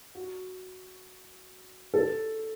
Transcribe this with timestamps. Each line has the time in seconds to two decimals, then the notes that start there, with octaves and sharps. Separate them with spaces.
0.15 F#4
1.94 A4